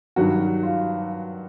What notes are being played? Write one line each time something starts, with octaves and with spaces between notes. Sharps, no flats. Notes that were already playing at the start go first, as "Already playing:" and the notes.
G2 D#3 F#3 F#4
F4